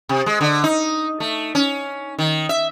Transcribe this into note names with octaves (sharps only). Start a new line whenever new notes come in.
C3
G#3
D3
D#4
A3
C#4
D#3
E5